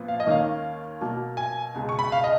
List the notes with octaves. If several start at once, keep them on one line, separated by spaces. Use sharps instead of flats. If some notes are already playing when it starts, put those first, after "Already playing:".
Already playing: A#2 F3 B3
F5
D#5
D#2 D#3 A#3 C#4 F5
B2 F#3 A#3
G#5
C#2 B2 G#3
C#6
B5
F5
D#5